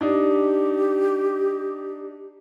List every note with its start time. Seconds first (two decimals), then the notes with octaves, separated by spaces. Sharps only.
0.01 D4 D#4 G4